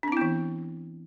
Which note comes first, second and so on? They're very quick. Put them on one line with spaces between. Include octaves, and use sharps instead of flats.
D4 C4 E4 B3 E3